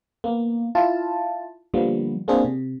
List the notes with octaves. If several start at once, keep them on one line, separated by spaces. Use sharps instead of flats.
A#3 B3
E4 F4 A5
D3 F3 G3 A#3 B3
A#3 C4 D4 F#4 G#4 C5
C3